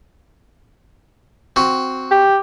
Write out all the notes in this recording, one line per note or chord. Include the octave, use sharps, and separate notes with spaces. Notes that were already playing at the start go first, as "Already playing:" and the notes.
C4 F#4
G4